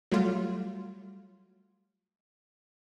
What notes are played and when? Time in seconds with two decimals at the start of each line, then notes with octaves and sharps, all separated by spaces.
0.11 F#3 G3 A3 F4